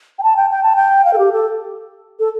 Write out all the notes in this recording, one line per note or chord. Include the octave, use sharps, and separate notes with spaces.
G5
A5
G5
G5
A5
G5
F5
A4
G4
A4
A4